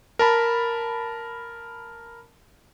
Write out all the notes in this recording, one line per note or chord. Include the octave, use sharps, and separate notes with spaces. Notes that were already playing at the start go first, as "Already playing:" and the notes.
A#4 A5 B5